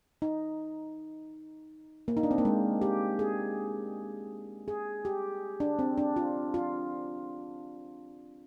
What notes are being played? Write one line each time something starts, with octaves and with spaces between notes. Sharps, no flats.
D#4
A#3
D#4
D4
C4
A#3
G#3
G4
G#4
G#4
G4
D4
C4
D4
F4
F4